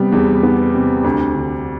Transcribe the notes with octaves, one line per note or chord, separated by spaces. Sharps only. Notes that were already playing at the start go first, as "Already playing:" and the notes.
Already playing: C3 G3 B3
E2
B3
C3
D2
D3